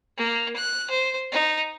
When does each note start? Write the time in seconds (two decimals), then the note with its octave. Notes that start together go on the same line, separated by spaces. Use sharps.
0.17 A#3
0.56 F#6
0.90 C5
1.32 D#4